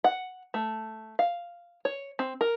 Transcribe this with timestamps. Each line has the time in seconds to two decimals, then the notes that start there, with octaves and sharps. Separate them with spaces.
0.04 F#5
0.54 A3
1.19 F5
1.85 C#5
2.19 C4
2.41 A#4